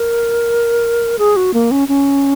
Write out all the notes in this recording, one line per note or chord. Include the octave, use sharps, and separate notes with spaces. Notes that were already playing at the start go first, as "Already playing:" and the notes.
Already playing: A#4
G#4
F#4
A#3
C#4
C#4